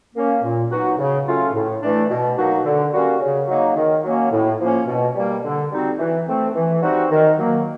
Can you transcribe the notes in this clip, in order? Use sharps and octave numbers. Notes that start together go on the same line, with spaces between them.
A#3 C#4
A#2
F#3 B3 D#4 F#4
C#3
F#3 A3 C#4 F4
A2
E3 A3 D4
B2
F#3 A#3 D#4 F#4
D3
G3 A#3 C#4 F#4
C#3
F#3 A#3 D#4
D#3
F#3 A#3 C#4
A2
F3 A#3 C#4
B2
G3 A#3
D3
G3 C4 D#4 F#4
E3
A3 C4
E3
G3 C4 D#4 F#4
D#3
F#3 A#3